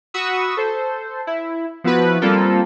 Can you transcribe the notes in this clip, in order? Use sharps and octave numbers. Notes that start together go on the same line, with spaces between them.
F#4 B5 C#6 D#6 E6
A4 C5
E4
F3 B3 E4 F#4 B4
G3 A#3 C4 F4 A4 A#4